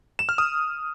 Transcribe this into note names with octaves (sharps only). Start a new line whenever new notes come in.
E7
F6
D#6